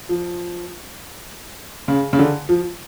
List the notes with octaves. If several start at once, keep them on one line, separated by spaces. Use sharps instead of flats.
F3
C#3
C#3
D3
F3